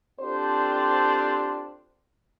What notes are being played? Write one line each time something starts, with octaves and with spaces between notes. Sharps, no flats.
C4 D4 F4 G4 A4 C5